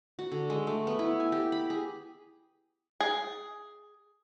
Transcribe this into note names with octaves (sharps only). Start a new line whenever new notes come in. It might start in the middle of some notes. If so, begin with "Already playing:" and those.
F#4
D3
G#3
A3
B3
E4
G#5
G4
B5
G#4
G#4